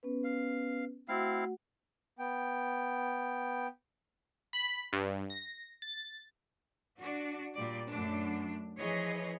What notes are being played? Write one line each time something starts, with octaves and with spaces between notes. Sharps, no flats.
B3 C#4 B4
F5
A3 C4 E4 F#4 F5 F#5
B3 G5
B5
G2
A#6
A6
D4 F#4
A#2 G3 D5
F#2 A3 D4
E3 F3 G#4 B4 C#5 D#5